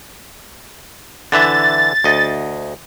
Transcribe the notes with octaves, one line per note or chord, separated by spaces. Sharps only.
D3 E3 E5 A6
D2 D#5